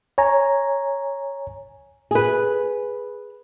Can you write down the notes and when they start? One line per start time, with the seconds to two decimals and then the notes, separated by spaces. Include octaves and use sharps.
0.18 C#5 G#5 A#5
2.11 G#4 B4